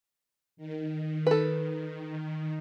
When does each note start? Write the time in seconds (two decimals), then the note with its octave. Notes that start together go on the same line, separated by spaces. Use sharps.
0.57 D#3
1.27 A4 B4